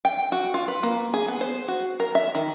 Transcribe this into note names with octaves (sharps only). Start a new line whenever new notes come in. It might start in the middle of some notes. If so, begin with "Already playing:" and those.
G5
F#4
F4
B4
A#3
G#4
B3
C5
F#4
A#4
E5
D#3